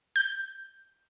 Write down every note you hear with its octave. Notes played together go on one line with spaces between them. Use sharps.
G6